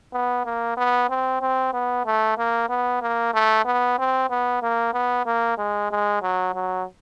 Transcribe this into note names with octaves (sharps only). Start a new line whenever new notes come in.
B3
A#3
B3
C4
C4
B3
A3
A#3
B3
A#3
A3
B3
C4
B3
A#3
B3
A#3
G#3
G#3
F#3
F#3